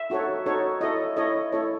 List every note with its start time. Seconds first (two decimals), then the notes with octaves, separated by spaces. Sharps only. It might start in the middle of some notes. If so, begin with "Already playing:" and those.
Already playing: E5
0.10 D#4 F#4 A4 C#5
0.46 D#4 F#4 A4 C#5
0.81 E4 A4 C#5 D#5
1.17 E4 A4 C#5 D#5
1.52 E4 A4 C#5